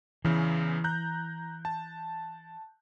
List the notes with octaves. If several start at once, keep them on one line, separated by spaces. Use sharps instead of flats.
E2 C#3 E3
A#5 F#6 G6
A5